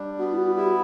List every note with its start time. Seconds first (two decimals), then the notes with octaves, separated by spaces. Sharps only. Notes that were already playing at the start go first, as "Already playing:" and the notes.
Already playing: G3 D4
0.19 B3 F#4
0.33 E4
0.37 F#4
0.57 E4 G4